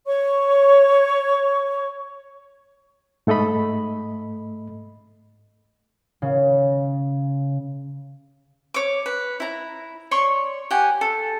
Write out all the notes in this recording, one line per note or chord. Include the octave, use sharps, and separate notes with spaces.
C#5 C#6
G#2 A3 A4 D#5 B5
C#3
C#5 D6
B4
E4 A#5
C#5 D5 C6 C#6
G4 F#5 G#5
A4